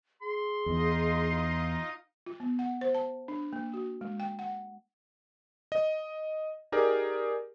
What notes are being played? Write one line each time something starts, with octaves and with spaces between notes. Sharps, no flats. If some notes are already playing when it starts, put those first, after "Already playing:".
G#4 C6
E2 D#4 F4 D#5
F4
B3
F#5
C5
A5
D4
A#3
F#4
G#3
G5
F#5
D#5
D#4 G4 G#4 A#4 D5